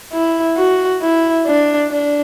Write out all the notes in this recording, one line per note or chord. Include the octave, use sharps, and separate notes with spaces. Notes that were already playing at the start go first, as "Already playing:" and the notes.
E4
F#4
E4
D4
D4